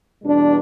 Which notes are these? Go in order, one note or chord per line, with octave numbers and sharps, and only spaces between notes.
E2 B2 G3 D4